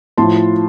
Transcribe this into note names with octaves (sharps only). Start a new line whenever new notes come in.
A2 F3 A5 C6